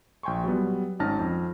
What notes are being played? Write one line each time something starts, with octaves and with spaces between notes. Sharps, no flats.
A#1 G5 G#5 C6 C#6
F#3 G3 B3
G#1 C#4 D#4 A5 F6 A#6
F2